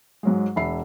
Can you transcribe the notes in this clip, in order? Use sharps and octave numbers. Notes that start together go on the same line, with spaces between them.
G#2 F#3 G#3
E1 E5 B5 C7